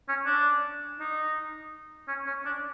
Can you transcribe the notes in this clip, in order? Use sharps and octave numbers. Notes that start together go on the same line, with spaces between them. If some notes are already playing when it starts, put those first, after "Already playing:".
C#4
D4
D#4
C#4
C#4
D4